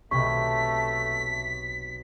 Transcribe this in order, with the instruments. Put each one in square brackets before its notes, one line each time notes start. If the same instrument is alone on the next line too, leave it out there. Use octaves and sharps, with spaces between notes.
[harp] B1 C3 B5 [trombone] A3 [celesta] C#6 [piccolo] B6